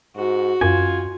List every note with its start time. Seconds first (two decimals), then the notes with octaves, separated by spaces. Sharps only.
0.16 G#2 F#4
0.61 F#2 F4 G#5